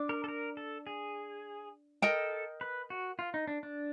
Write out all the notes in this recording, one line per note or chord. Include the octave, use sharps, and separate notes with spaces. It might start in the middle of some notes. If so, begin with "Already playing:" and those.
Already playing: D4 D5
A#4
A4
A#4
A4
G#4
A4 A#4 D#5 G5
B4
F#4
F4
D#4
D4
D4